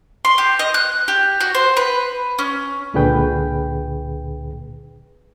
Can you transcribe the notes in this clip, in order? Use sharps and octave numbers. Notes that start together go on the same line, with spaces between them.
C6
G4
D#5
F#6
G4
F#4
C5
B4
C#4
C#2 A#2 D3 G#4 B4 G5